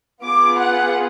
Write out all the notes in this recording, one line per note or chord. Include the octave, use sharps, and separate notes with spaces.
B3 F4 G#4 D6
F#5